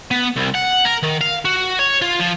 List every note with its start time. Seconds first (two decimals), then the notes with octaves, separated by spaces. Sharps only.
0.11 B3
0.37 C2
0.55 F#5
0.85 A#4
1.03 D#3
1.21 F5
1.45 F#4
1.79 C#5
2.02 F4
2.20 F3